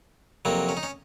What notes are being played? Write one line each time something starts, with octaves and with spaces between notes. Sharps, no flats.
F2 C3 F#3 A#3
C#4
D#4
C#4